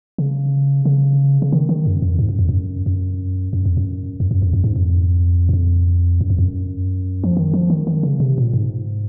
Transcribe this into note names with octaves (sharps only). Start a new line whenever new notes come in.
C#3
C#3
C#3
D#3
D#3
F#2
F2
G#2
F#2
F2
F#2
F#2
F#2
F2
F#2
F#2
F#2
F2
F#2
G#2
F2
F#2
F2
F#2
F2
F#2
F3
D#3
F3
D#3
D#3
C#3
C3
A#2
G#2